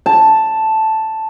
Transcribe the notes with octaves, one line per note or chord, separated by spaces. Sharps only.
A5